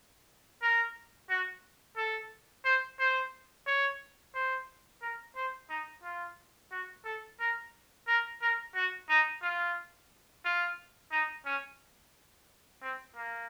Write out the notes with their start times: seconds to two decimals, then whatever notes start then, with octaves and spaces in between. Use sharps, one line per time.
0.62 A#4
1.30 F#4
1.97 A4
2.65 C5
2.99 C5
3.67 C#5
4.34 C5
5.02 A#4
5.36 C5
5.70 D#4
6.03 F4
6.71 F#4
7.05 A4
7.40 A#4
8.07 A#4
8.41 A#4
8.75 F#4
9.09 D#4
9.42 F4
10.45 F4
11.11 D#4
11.45 C#4
12.82 C4
13.15 A#3